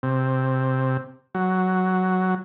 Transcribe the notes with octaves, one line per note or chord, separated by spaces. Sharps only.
C3
F#3